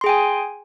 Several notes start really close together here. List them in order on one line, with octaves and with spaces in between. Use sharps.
C6 G#4 G5 G#5